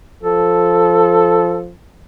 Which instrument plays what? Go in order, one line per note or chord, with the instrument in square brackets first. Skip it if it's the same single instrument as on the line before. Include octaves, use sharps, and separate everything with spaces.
[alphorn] F3 [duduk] A4